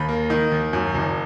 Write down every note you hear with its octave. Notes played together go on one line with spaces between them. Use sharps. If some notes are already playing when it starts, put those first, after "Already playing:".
Already playing: D#2 B5
A#3
D#3
D#2
F#2
F#1